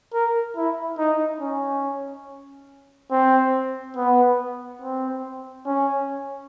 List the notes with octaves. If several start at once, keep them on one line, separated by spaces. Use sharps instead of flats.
A#4
E4
D#4
C#4
C4
B3
C4
C#4